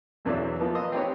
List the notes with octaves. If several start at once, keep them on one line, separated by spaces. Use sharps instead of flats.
B1 E2 E3 F#3 D5 E5
E3 F3 A#3 B3
D#5 A#5 C6 D#6 E6
C4 D#4 G4 B4 C#5